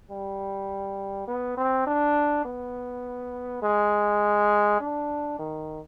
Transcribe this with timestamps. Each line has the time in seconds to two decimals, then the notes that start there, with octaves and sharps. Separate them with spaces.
0.11 G3
1.28 B3
1.57 C4
1.87 D4
2.45 B3
3.62 G#3
4.80 D4
5.39 D#3